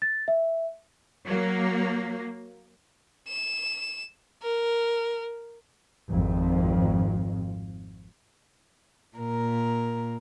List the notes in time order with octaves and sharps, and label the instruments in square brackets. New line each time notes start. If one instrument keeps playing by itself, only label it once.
[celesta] A6
E5
[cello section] F#3 A#3
[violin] E7
A#4
[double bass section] G#1 F2
[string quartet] A#2 A#4